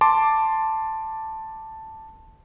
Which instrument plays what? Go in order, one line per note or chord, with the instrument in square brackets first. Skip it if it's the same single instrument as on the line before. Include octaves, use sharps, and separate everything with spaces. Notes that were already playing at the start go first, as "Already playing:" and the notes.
[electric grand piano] A5 C6 D6